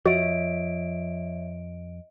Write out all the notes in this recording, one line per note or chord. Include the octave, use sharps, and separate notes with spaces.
F2 F3 F#4 C#5 D#5 E5 D7